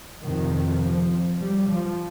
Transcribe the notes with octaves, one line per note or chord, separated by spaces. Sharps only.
F2 C3 D#3
F3
G3
F3